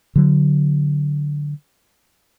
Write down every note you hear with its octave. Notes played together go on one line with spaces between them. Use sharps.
D3 F#3